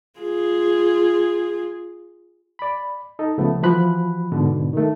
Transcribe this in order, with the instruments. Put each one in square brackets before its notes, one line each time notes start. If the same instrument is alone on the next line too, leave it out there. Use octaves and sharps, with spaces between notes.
[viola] F4 G#4
[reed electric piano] D5 B5
D#4 A4 D#5
C#2 C#3 F3 A3 B3
E3 F3 F#4 B5 F#6
G#2 B2 D3
D#3 A3